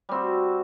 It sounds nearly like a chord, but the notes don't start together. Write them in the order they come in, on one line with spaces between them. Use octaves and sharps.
G3 C4 F#4